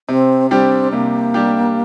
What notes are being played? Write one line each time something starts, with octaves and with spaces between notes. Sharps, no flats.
C3 C4
G3 C4 D4 G4
C3 A#3
G3 D4 G4